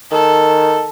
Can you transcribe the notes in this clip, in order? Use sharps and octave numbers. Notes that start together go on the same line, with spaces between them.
D#3 A4